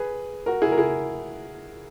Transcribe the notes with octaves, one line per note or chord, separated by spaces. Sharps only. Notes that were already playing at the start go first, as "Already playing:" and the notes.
Already playing: G#4 B4
F#4 A#4
E4 G#4
A#4
E4 G#4